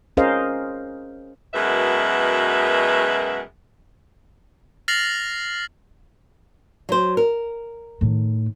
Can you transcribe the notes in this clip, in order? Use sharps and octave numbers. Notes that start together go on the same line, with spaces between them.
C#4 G#4 A#4 C5 D#5 F5
F#2 B2 G#3 A#4 B4 E5
F6 A6 A#6 C7 F7 F#7
F#3 C5
A#4
A2 D#3